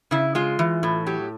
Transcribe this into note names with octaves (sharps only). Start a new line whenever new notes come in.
C#3 E4
G#3 F4
E3
A2
F#3 G4